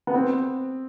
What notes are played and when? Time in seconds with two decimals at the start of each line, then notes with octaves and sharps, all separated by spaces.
0.07 B3
0.14 C4